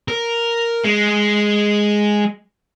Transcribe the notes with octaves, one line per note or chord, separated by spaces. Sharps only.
A#4
G#3